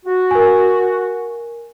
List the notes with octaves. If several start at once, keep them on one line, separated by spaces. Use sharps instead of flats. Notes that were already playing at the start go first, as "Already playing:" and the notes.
F#4
A#4 G#5